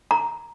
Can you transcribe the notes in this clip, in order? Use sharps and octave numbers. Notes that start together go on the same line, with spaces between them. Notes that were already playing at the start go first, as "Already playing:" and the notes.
A#5